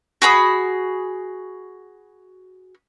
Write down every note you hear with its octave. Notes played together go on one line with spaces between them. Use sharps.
F#4 G#4 B5 D#6